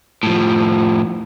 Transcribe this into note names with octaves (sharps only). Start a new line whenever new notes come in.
A2 F3